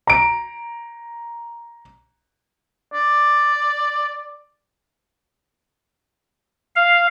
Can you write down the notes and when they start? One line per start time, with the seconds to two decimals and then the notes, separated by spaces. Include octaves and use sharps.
0.07 A#5 D7
2.93 D5
6.76 F5